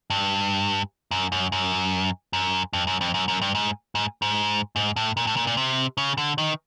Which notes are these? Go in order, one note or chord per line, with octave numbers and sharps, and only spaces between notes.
G2
F#2
F#2
F#2
F#2
F2
F#2
F2
F#2
F#2
G2
G#2
G#2
G#2
G#2
A2
A#2
A2
A#2
A#2
C3
C#3
D3
D#3